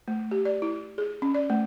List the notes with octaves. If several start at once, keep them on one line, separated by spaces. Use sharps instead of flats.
A3
G4
D5
E4
G#4
C#4
D5
A3